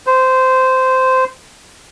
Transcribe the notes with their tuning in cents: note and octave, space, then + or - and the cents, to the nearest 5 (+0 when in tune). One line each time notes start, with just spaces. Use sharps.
C5 -15